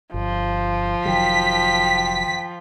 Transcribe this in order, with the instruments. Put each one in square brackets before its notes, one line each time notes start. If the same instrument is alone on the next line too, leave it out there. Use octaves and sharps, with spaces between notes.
[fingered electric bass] G1 [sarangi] F3
[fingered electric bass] F1 D#3 F#3 [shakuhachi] G5 [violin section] B6